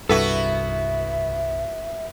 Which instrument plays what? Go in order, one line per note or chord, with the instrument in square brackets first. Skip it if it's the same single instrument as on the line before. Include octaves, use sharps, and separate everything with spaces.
[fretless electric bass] C2 G2 [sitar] B3 E4 F#4 [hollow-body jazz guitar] A4 B4 [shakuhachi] E5